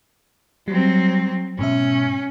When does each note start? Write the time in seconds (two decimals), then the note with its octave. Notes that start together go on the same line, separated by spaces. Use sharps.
0.68 F#3 G3 C4
1.59 G#2 B2 C#4 E5